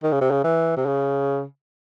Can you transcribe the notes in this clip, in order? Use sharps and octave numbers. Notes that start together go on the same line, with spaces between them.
D#3
C#3
C3
C#3
E3
C3
C#3